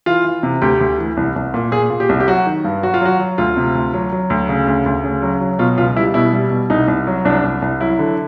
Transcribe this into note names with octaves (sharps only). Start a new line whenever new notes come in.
E3 F4
E3
C3
D2 G4
D2
E3
C2
C2
A#2
A#2 G#4
A#2
G4
C2
G4
F#3 F#4
D#3
G2
F#3 F#4
F4
F#3 F#4
F#3
D2 F4
C3
D2
F#3
F#3
D2
C#3
D2
D2
C#3
F#3
F#3
B2 F4
C#2 F4
G3 E4
B2 E4
G3
B2
C2 D#4
C2
F#3
C2 D4
C2
C2
F#3 E4
D3